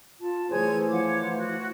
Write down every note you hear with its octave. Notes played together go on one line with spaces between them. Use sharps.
F4 A5
E3 A3 G#4 C5 C#5 G#5 G#6
F3 C#5 F#5 D6
F#4